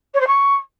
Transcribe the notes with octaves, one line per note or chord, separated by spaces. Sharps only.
C#5
C5
C#6